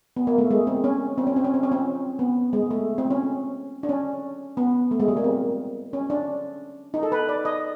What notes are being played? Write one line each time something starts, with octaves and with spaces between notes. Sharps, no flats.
B3
A#3
A3
G#3
C4
C#4
C4
C#4
C4
C#4
C4
C#4
C4
B3
G#3
A3
C4
C#4
D4
C#4
B3
A3
G#3
G3
A#3
C4
C#4
D4
D#4
A4
B4
D5
D#5